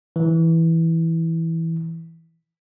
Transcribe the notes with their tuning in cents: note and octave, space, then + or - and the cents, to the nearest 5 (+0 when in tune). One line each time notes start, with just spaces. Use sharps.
E3 -10